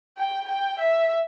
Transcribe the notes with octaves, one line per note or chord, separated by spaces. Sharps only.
G5
G5
E5